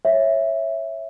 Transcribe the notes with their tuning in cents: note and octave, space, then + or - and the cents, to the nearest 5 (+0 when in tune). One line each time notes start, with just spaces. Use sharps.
C#5 -20 E5 +0